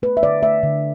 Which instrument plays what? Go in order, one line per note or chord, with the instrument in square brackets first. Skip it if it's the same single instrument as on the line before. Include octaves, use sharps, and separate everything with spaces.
[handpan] A3 B4
E5
D3 D5
A3 E5
D3